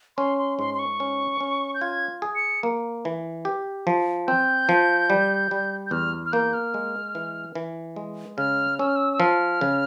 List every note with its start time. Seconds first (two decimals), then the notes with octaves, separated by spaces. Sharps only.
0.17 C#4 C6
0.38 C6
0.59 G#2 C6
0.74 C6
0.79 C#6
1.00 C#4
1.40 C#4
1.75 G6
1.81 F4 G#6
2.22 G#4
2.36 C#7
2.63 A#3
3.05 E3
3.45 G4
3.87 F3
4.28 C4 G6
4.69 F3
5.10 G3
5.51 G3
5.87 G6
5.91 E2 F6
6.26 F6
6.33 A#3 G6
6.53 F6
6.74 G#3
7.15 E3
7.55 E3
7.96 G#3
8.38 C#3 F6
8.79 C#4 E6
8.87 F6
8.96 E6
9.13 E6
9.20 F3 F6
9.61 C#3